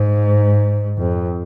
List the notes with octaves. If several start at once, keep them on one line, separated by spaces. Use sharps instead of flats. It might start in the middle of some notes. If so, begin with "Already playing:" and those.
Already playing: G#2
F2